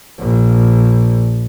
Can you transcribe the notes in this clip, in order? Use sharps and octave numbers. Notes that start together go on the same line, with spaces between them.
A#1